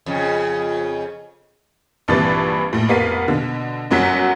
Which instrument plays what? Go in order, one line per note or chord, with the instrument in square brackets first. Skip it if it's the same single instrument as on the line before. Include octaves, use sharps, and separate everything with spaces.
[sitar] F2 C#3
[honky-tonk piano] A#1 G2 C3 E3 B4 A6
A#1 A2
F1 A#3 B3 F5 B6 D#7
B2 D3
G1 F#2 F#3 F#4 B6